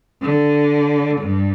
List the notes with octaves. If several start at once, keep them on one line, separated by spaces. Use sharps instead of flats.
D3
G2